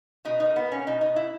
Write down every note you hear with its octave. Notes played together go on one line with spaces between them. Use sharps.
B2 D#4
D#4
A#3
B3
A#3
C#4
B2 D#4
D#4
B2
E4